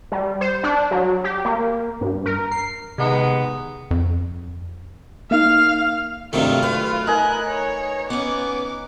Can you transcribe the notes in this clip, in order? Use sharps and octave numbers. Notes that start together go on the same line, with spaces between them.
G3
C5
D4
F#3
G4
A#3
G2
A#4
C7
C3 D#3 G#3 B3
F2
A#3 D#4 F5
G2 C3 D#3 F#3 A3 E4 F4
B4 F5
D#4 A#4 G#5 F#6
C#5
B3 C#4 D6